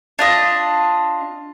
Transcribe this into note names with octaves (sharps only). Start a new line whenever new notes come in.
D4 F4 D#5